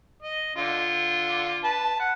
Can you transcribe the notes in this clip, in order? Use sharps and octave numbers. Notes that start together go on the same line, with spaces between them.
D#5
D3 F4
B4 A5
F#5